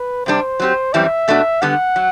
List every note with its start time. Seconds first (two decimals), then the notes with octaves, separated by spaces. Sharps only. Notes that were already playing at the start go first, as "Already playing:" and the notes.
Already playing: B4
0.26 C3 G3 D4 C5
0.60 F#3 C4 G4
0.93 F#2 E3 G3 C4 E5
1.28 B2 A3 D4 F#4
1.62 D3 G3 B3 F#5
1.96 F#3